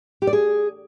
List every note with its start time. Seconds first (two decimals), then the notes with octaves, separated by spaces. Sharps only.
0.22 G4
0.27 D5
0.33 G#4